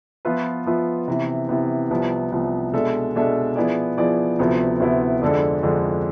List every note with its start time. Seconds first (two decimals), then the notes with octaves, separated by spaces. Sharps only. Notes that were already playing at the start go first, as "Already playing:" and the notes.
0.25 F3 B3 F4 B4 E5
0.66 F3 B3 F4 B4 E5
1.08 C3 E3 B3
1.49 C3 E3 B3
1.91 C2 C3 F3 B3
2.32 C2 C3 F3 B3
2.73 B2 G#3 D4 A4 E5
3.15 B2 G#3 D4 A4 E5
3.56 F3 B3 E4 G#4 D5
3.98 F3 B3 E4 G#4 D5
4.39 D2 C3 F3 B3 E4
4.80 D2 C3 F3 B3 E4
5.21 F2 D3 G#3 D4 A4
5.63 F2 D3 G#3 D4 A4